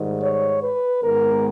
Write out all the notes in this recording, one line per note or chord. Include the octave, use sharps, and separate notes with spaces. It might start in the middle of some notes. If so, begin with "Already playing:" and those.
Already playing: G#2 D#3 G3
C#5
B4
G#2 D#3 G#3 B3 A#4